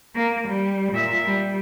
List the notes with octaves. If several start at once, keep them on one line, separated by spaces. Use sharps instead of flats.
A#3
G3
A#2 E5
G3